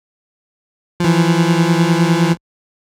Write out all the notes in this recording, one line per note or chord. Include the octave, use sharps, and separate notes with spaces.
E3 F3